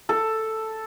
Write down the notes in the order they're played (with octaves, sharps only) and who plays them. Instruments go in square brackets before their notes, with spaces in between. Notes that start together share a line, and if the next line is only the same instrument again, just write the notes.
[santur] A4